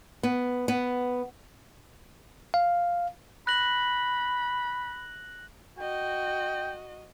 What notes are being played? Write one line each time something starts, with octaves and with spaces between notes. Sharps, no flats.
B3
B3
F5
B5 F#6 A#6 F#7
F#4 D#5 G5